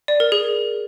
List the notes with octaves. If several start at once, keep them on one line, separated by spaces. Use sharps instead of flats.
D5
A#4
G#4